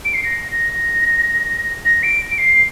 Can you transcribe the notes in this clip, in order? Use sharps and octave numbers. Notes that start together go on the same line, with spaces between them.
D7
C7
A#6
A#6
A#6
D7
D7
C7